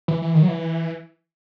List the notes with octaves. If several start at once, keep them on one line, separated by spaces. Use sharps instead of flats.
E3
E3
D#3
F#3
E3